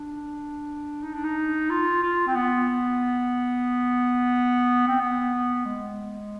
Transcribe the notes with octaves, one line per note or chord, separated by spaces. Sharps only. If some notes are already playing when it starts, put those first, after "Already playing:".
Already playing: D4
D#4
D4
D#4
F4
F4
C4
B3
C4
B3
G#3